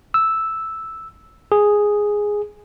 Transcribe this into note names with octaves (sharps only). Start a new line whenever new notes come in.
E6
G#4